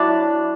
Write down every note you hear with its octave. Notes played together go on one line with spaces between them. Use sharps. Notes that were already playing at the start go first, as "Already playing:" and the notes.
Already playing: F#3 D4 E4 F#4